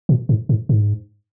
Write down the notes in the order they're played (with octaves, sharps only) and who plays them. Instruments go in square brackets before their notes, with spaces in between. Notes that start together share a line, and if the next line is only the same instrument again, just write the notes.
[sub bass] A#2
G#2
G#2
G#2